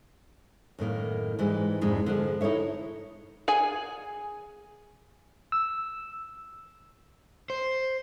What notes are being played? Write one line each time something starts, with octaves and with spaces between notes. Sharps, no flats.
F#2 A2 D#3 A#3
G#2 E3 G3 G#3
F2 G#2 C3 G#3 D4
D3 F3 G#3
D#4 E4 A4 C#5 E5
G#4 G#5
E6
C5